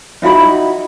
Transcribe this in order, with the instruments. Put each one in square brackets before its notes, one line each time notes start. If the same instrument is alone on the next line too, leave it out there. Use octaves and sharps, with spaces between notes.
[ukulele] D#4 E4 F#4 B5